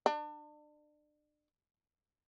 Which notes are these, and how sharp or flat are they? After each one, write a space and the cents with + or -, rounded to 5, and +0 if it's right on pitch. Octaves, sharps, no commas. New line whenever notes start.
D4 +35